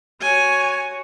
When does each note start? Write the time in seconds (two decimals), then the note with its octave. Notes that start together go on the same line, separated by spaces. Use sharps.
0.21 F#4 C#5 G#5